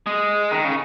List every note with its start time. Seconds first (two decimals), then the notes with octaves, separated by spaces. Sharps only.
0.07 G#3
0.51 D#3
0.65 C#3